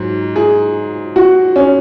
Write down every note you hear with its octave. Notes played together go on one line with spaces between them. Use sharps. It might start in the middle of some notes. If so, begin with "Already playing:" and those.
Already playing: G#2 F#3
G#4
F#4
C#4